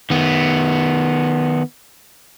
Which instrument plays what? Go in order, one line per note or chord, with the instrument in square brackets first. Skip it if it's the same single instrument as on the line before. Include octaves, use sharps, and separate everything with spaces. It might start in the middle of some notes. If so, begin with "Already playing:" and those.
[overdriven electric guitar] D#3 B3